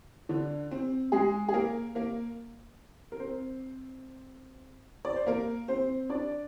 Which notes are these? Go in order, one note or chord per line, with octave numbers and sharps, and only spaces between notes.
D3 D4
C4
G#3 G#4
G#4
A#3 A#4
A#3 A#4
A#4
C4 C5
D5
C5
A#3 A#4
C4 C5
D4 D5